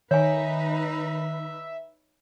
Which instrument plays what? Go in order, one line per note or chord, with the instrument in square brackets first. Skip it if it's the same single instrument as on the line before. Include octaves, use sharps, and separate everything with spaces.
[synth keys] D#3 [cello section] D#4 B4 [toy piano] C#5 G#5 [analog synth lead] E5